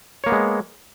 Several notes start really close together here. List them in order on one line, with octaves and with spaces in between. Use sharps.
C#5 A#3 B3 G#3